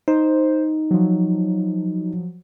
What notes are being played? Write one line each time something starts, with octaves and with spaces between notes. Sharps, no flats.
D#4 C5
F3 F#3